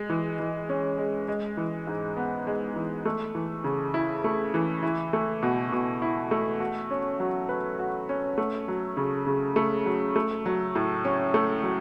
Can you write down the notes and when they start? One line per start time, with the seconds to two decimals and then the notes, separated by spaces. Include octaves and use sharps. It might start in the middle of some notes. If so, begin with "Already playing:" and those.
Already playing: G#3
0.09 E3
0.39 E3
0.69 C#4
0.98 G#3
1.28 G#3
1.57 E3
1.87 G#2
2.17 B3
2.47 G#3
2.76 E3
3.05 A3
3.35 E3
3.64 C#3
3.94 E4
4.24 A3
4.54 E3
4.83 E4
5.13 A3
5.43 B2
5.72 B2
6.02 E4
6.31 A3
6.60 F#4
6.91 C#4
7.20 F#3
7.49 B4
7.79 F#4
8.09 C#4
8.38 A3
8.68 F#3
8.97 C#3
9.26 C#3
9.56 A3
9.86 F#3
10.16 A3
10.46 F#3
10.75 A2
11.05 C#4
11.34 A3
11.63 F#3